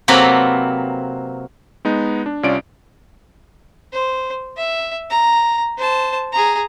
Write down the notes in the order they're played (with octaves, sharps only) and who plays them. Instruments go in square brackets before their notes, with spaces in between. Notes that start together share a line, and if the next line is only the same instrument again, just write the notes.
[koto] C3 F#3 A#3 C4 A4 B4
[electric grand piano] G#3 B3 D#4
D4
C2 C#4 F4 D5 D7
[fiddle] C5
E5
A#5
C5 A5
G#4 A#5